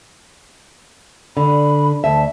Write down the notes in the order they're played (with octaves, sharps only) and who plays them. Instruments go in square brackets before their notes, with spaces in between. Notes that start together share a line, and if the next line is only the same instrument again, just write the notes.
[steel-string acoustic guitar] D3 [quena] B5
[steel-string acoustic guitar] D2 E5 [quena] A5